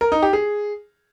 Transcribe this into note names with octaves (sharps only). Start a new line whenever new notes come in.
A#4
D#4
G4
G#4